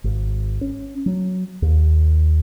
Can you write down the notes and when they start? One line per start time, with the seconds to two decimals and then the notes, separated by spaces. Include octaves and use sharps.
0.04 G#1
0.61 C#4
1.06 F#3
1.62 D#2